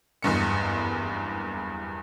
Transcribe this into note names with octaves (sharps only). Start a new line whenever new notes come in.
F#1 E2 G2 C#7